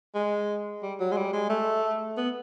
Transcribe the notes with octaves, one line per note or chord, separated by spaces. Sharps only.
G#3
G3
F#3
G#3
G3
G#3
A3
B3